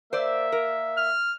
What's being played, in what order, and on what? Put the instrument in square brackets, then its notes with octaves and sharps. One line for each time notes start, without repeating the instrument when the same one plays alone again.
[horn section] A#3 E5 [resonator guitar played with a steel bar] C5 D5
[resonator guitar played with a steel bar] A#4
[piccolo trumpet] F6